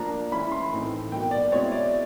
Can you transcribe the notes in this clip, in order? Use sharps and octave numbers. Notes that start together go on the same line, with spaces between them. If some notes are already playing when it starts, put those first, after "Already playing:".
Already playing: F3 A#3 D4 A#5
E3 G#3 C#4 E4 B5
C6
A2 E3 A3 C4 D#4
B2 F#3 A#3 G5
D5
B2 G#3 C4 E4 C#5
D5